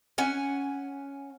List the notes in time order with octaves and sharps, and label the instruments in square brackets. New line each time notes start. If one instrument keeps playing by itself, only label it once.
[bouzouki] C#4 F#5 G#5